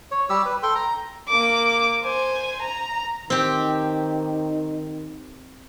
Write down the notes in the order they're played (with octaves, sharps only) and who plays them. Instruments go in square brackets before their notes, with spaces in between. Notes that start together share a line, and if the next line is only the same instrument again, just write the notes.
[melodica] C#5
G3 G4 E6
B4
A4 G5 C6
A#5
[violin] A#3 D6
C5 G#5
A#5
[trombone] D#3 [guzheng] C4 G4